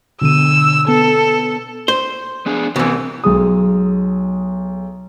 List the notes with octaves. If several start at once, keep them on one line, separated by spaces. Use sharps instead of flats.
B2 D3 E6 D#7
B3 A4
C5
B3 D4 G#4
C2 E3 B3 C4
B1 G#3 D#6